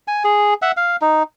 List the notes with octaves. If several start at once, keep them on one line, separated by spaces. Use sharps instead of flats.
G#5
G#4
E5 F#5
F5
D#4